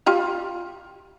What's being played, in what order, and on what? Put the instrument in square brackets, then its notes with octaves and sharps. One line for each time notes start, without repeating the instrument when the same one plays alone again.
[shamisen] F4 G4 F5